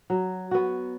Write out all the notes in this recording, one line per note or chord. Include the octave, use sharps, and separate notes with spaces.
F#3
B3 F#4